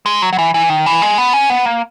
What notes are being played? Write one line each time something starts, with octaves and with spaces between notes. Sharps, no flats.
G#3
F#3
F#3
E3
E3
D#3
E3
G#3
B3
C#4
B3
A#3